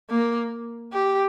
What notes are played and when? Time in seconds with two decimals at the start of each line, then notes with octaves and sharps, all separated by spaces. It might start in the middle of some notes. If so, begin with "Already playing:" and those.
0.10 A#3
0.93 G4